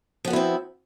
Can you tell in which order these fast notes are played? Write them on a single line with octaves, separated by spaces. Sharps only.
F3 F#4 B3 E4 C4